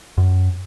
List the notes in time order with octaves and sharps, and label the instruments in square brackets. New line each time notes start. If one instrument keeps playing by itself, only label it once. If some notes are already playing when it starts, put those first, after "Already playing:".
[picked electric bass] F#2